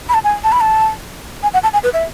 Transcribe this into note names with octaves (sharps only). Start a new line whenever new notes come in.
B5
A5
G#5
A5
B5
A5
G#5
F#5
A5
G#5
B4
E5